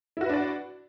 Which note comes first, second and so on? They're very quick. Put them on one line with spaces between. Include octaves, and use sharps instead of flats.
E4 F#4 B4 D4 D5